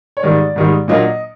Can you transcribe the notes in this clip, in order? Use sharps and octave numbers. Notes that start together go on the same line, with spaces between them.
C#5
G#2 D#3 G3 D5
G#2 D#3 G3
A#2 F#3 A#3 D4 D#5